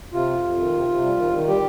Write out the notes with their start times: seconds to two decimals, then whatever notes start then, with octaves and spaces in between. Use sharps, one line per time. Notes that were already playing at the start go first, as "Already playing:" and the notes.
0.13 C3 F4
0.29 F2
0.43 F2
0.59 D#3
0.73 C3
0.89 C3
1.03 G3
1.17 D#3
1.33 D#3
1.47 G3 G4